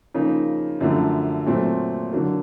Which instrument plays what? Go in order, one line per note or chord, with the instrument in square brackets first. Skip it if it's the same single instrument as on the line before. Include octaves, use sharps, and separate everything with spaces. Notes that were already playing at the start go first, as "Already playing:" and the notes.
[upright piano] C#3 F3 A#3 D#4
F#2 D3 F3 A3
A#2 F#3 A3 C4
D3 F#3 A#3